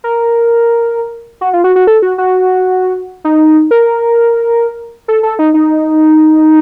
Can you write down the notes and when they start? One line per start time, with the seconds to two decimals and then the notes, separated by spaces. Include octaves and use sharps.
0.04 A#4
1.41 F#4
1.53 F4
1.64 F#4
1.76 F#4
1.87 A4
2.02 F#4
2.18 F#4
3.24 D#4
3.71 A#4
5.08 A4
5.23 A4
5.39 D#4
5.54 D#4